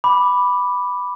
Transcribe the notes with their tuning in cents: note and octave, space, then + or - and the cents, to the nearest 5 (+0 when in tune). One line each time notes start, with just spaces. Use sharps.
B5 +0 D6 +0